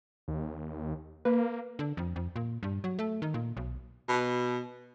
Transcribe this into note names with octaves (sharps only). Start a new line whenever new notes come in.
D#2
A#3 B4
D3
F2
F2
A#2
G2
F#3
A3
D#3
A#2
B1
B2